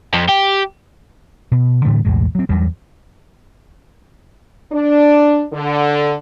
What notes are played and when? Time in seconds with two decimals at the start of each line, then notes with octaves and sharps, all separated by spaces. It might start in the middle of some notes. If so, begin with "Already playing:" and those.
0.14 F2
0.29 G4
1.52 B2
1.85 A2 D3 E3 A3
2.05 B1 E2 A2 G#3
2.35 F#3 C4
2.49 E2 G2 F#3 G3
4.72 D4
5.53 D3